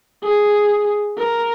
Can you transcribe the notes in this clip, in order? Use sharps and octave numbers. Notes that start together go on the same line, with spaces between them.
G#4
A#4